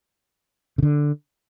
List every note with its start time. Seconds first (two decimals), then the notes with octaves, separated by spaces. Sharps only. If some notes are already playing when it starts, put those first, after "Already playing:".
0.78 C#3
0.83 D3